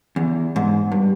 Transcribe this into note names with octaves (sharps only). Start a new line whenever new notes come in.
E2
G#2
G2